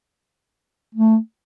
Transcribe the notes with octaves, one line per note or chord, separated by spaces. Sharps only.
A3